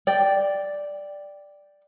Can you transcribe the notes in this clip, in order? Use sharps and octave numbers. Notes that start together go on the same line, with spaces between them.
D5 G5